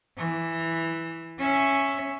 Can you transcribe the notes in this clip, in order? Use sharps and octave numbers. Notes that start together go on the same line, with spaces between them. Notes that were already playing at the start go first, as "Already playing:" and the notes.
E3
C#4 E5